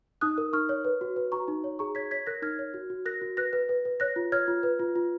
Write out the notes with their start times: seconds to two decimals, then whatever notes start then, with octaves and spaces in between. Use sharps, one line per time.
0.21 D#4 D#6 F#6
0.38 A#4
0.53 D#4 C#6 F6
0.69 C#5
0.85 B4
1.01 F#4
1.16 B4
1.32 F#4 A#5 C#6
1.48 D#4
1.64 C#5
1.79 G#4 A#5 C#6
1.95 C#5 G#6 B6
2.11 C#5 G#6 B6
2.27 A#4 F#6 A#6
2.42 D#4 F6 G#6
2.59 C#5
2.74 F#4
2.90 F#4
3.05 A#4 F#6 A#6
3.22 F#4
3.37 B4 F#6 A#6
3.53 B4
3.69 B4
3.85 B4
4.00 C#5 F#6 A#6
4.16 F4
4.32 C#5 F6 G#6
4.48 F4
4.63 B4
4.79 F4
4.96 F4